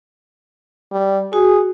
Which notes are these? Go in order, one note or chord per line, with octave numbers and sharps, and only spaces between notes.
G3
F#4 G#4